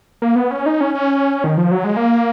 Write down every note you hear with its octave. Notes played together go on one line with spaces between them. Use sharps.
A#3
B3
C#4
D#4
C#4
C#4
D#3
F3
F#3
G#3
A#3